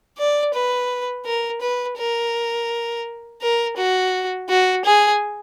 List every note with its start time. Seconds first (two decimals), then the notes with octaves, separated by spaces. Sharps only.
0.18 D5
0.54 B4
1.25 A#4
1.61 B4
1.98 A#4
3.41 A#4
3.77 F#4
4.49 F#4
4.85 G#4